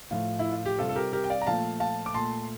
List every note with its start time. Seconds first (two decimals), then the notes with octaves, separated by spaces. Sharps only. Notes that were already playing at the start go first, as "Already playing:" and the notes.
0.11 A2 F3 A3 F4
0.39 E4
0.52 F4
0.66 G4
0.79 C3 G3 F4 A4
0.89 A4
0.96 G4 A#4
1.13 G4 A#4
1.24 G5
1.30 D5 F5
1.42 A#5
1.47 A#2 F3 A3 F5 A5
1.80 F5 A5
2.06 D6
2.14 A#2 A3 A5 C6